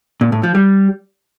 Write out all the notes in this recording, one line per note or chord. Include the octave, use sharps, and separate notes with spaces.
A#2
A2
F3
G3